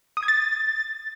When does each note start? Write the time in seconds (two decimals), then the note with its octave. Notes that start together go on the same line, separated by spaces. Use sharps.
0.17 D#6
0.23 G#6
0.28 A6